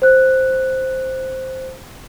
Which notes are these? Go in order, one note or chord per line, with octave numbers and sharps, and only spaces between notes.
C5 F#6